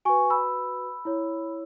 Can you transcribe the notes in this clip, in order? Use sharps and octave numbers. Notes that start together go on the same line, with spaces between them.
F#4 B4 G#5 C#6
B5 E6
E4 C#5